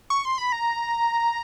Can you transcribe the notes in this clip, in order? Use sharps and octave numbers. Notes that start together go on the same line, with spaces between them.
C#6
C6
B5
A#5